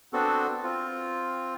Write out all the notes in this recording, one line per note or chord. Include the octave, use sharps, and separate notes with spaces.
B3 C4 D4 F#4 A4
C4 F4